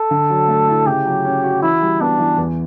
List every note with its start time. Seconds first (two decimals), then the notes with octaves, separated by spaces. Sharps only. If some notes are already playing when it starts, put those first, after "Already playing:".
Already playing: A4
0.11 D3
0.30 F#3
0.48 A3
0.68 E4
0.86 C#3 G4
1.06 F#3
1.25 C#4
1.44 F#4
1.63 E3 E4
1.82 G3
2.01 B3 D4
2.19 E3
2.38 E2